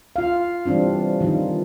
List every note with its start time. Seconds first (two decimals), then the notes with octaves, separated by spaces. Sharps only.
0.16 F4 F5
0.66 E3 G3 C4 D4 F4
1.21 D#3 F3 D4 D#4 F4